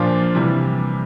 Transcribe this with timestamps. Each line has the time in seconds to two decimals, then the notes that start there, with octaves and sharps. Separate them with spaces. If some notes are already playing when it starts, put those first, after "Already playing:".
Already playing: A#2 F3 A#3 D4 F4
0.35 C3 E3 G3